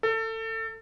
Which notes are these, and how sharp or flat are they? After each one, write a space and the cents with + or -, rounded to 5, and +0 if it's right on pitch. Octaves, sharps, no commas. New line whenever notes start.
A4 +25